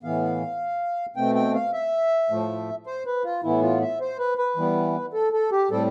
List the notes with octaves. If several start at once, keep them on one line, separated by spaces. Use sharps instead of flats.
A2 E3 B3 F5
B2 A3 C4 G5
G5
F5
E5
A2 F3 A3
C5
B4
F4
A2 E3 B3 E4
F4
E5
C5
B4
B4
E3 G3 B3
A4
A4
G4
A2 G3 C4 A4